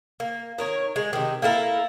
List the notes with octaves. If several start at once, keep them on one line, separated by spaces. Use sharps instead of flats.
A#3
D#3 A#4 C#5
G#3
C3 D#3
A#3 E4 A4 A#4